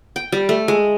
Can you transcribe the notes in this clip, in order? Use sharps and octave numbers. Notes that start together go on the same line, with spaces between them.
G5
G3
A3
G#3